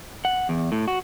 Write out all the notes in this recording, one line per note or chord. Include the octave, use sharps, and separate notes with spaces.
F#5
E2
A2
F#4